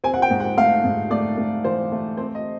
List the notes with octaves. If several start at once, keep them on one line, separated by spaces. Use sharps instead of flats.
C4 G#5
F#5
G5
G#2
F#5
A3 F5
G#2
A3 D5
A3
E3 C5
A3
C4 C5
D#5